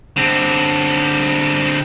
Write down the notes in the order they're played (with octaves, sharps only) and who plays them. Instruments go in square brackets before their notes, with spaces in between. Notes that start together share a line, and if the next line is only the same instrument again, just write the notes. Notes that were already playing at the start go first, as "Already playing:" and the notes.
[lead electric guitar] D3 C4